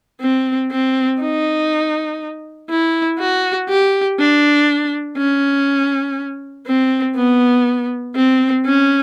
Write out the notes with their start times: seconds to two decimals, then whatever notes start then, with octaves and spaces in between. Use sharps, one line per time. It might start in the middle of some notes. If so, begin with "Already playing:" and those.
0.21 C4
0.71 C4
1.21 D#4
2.70 E4
3.19 F#4
3.69 G4
4.19 D4
5.18 C#4
6.67 C4
7.16 B3
8.16 C4
8.66 C#4